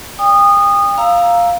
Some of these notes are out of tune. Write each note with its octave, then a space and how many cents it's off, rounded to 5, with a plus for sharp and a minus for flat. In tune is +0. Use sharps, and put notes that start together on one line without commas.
D5 +0 G5 +40 D#6 -20
F5 +0 A#5 +0 E6 +0